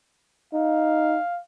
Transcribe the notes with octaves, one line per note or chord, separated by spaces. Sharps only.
D#4 F5